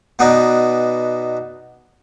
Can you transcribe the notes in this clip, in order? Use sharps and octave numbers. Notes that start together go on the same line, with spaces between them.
B2 B3 D4 D#4